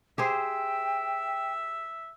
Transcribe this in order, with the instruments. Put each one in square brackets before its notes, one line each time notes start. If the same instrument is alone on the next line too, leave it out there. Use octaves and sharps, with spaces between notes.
[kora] G4 G#4 C5 [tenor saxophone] E5 [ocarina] G5